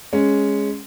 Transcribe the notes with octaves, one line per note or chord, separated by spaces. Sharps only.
G#3 C#4